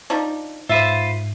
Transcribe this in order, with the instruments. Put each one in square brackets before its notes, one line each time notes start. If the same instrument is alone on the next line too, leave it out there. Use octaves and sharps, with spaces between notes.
[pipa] F3 D4 D#4
[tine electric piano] G#2 [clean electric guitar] F4 B4 C5 [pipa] E5